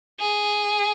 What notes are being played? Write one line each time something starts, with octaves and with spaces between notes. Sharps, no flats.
G#4